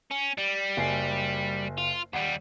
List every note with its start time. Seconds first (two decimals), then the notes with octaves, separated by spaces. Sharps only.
0.11 C#4
0.38 G3
0.77 F#1 G#5 C7
1.78 F4
2.13 D#2 G3 F#5